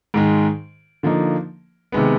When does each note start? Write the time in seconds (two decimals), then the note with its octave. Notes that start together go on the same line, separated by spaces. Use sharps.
0.14 G#2 D#3 G#3
1.03 D3 F3 A#3 D#4
1.92 C3 D#3 G#3 B3